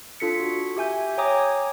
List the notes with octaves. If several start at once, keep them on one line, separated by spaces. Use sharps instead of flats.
D4 F4 A4 B6 C#7
F#4
G4 E5 G#5 G6
C#5 G5 G#5 A#5 D6 D#6